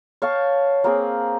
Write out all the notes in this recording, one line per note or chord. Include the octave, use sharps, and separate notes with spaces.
C#5 F5 G5 A5
A#3 C4 G#4